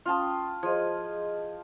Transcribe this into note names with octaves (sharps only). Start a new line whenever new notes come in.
C#4 F4 G5 A5 D#6
F3 G#4 D#5